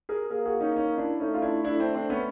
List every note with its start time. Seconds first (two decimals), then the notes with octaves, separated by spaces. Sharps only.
0.09 G#4 A#4
0.30 A#3 G#4 A#4
0.46 F#4 G#4
0.60 C#4 D#4
0.76 C#4 D#4
0.98 D4 E4
1.20 A3 C#4 D#4
1.34 F4
1.42 D4 E4
1.64 D4 E4
1.79 C4 D4
1.95 C4 D4
2.10 B3 C#4